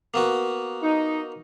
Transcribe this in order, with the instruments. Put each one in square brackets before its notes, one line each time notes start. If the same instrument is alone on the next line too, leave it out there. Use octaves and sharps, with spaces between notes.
[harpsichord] A#3 B3 F#4
[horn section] D#4